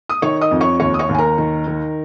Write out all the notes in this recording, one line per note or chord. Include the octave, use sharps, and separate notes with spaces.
D#6
D#3 C#5 C#6
D#5 D#6
F2
C#5 C#6
D#2 C#5 C#6
D#6
C#5 C#6
D#2
G#5
A#4 A#5
D#3
D#3